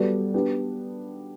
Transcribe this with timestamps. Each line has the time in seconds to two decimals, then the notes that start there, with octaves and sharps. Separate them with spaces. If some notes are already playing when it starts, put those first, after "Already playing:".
Already playing: G3 B3 F#4 A4 D5
0.34 B3 D4 G4